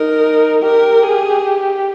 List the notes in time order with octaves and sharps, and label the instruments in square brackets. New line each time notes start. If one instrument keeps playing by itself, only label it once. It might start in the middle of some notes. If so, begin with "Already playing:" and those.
Already playing: [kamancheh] D#4 [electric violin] A#4
[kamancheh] G4 [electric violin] A#4
[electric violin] G#4